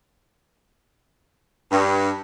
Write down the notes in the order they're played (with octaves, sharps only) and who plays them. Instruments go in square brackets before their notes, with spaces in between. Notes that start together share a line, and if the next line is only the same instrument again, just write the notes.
[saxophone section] G2